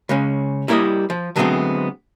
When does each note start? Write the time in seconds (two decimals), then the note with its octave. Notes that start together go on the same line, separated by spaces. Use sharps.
0.09 C#3 G#3 C#4
0.68 G3 A#3 E4 C5 C#5 D#5
1.10 F3
1.36 D3 F#3 G#3 A3 B3 C4